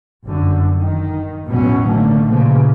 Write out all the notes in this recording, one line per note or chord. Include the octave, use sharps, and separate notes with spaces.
G1 F#2 D3
D#3
A1 E2 B2 F#3 B3 C#4
B2 D3 D#3 A3 A#3
A#2 C#3 E3 F3 A#3